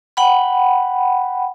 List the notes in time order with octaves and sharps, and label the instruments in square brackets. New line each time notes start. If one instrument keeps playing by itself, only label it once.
[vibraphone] F#5 G5 B5